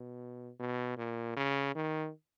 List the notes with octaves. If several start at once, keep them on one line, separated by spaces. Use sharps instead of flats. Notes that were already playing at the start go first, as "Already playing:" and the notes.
Already playing: B2
B2
A#2
C#3
D#3